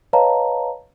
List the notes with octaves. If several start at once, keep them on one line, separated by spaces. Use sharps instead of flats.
B4 C#5 D#5 F5 A5 A#5